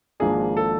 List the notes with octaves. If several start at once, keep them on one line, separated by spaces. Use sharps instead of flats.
G#1 G#2 F3 A#3 D4 G#4
A4